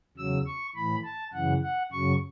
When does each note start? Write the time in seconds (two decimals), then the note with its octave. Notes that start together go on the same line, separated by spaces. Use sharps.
0.17 E2 C#3 F#3 E6
0.46 C#6
0.75 A2 E3 B5
1.04 A5
1.33 F#2 C#3 E3 F#5
1.63 F#5
1.92 F#2 C#3 F#3 C#6